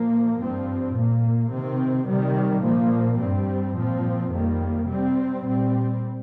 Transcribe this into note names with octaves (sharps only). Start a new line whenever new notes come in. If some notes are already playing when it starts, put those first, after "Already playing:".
Already playing: A#2 F3 A#3
G2 F3 C4
A#2 A#3
C3 D#3 C4
C3 D#3 G3
A#2 F3 A#3
G2 G3 C4
A#2 F3 C4
F2 D#3 G3 A#3
C3 G3 C4
A#2 G3 C4